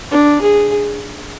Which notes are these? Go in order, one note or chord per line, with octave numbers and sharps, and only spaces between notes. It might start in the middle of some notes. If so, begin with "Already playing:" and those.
D4
G#4